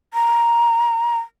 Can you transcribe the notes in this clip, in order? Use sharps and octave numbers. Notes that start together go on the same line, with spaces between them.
A#5